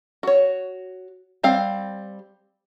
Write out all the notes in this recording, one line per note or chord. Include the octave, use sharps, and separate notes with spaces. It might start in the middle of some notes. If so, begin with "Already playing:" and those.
F#4 C#5
G3 C4 F5